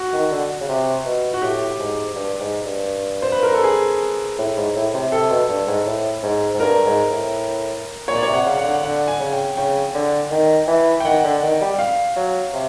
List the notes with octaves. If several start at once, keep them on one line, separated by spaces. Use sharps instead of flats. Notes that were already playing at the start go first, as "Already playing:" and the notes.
Already playing: F#4
D#3
D3
C#3
C3
B2
F#4
A2 G4
G#2
G2
G#2
G2
C5
B4
A#4
A4
G#4
A2
G#2
A2
C3
C3 A4
B2
G2
G#2
A2
G#2
G#2
G2 A#4
G#2
A2
A#2 C#5
D5
C#5
C3
F#5
C#3 F5
F#5
D3
D3 F#5
G#5
C#3
G5
C#3 G5
D3
D#3
E3
G5
D#3 F#5
D3
D#3
G3
F5
F#3
C3